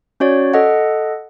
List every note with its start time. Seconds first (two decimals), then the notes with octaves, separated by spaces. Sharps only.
0.20 C#4 F#4 C#5 D5
0.54 A4 D#5 F#5